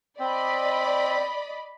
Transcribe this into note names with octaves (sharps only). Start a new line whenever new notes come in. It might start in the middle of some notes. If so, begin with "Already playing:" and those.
C4 D5 D#5 B5